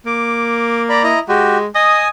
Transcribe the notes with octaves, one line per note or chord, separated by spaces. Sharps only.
A#3 D6
D5 A#5 B5
E4 D#5 A#5
G#3 F#4 G4
D#5 G#5 D#6